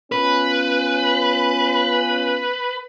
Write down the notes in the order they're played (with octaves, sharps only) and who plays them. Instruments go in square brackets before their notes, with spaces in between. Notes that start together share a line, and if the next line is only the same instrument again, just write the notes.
[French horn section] B3 C#4 F4 [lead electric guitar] B4